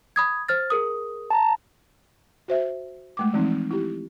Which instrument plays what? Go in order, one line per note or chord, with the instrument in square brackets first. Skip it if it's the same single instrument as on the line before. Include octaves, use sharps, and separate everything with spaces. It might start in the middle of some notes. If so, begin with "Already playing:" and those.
[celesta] B5 D#6 G#6
C5 F6 A6
G#4 A#4 D#6
[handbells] A5 A#5
[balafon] F#4 C5 E5
G#3 A3 D6
E3 F3 G#3 C4 D#4
E4 G4